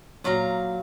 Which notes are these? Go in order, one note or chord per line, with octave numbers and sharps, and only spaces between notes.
A#2 F#3 F5 A#5